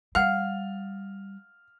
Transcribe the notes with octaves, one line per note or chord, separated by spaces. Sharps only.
G3 F5 F#5 F6